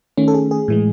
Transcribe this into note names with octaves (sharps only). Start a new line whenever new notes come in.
D#3 A3 C#4
A4
G#4
G#4
A2 E3 G#3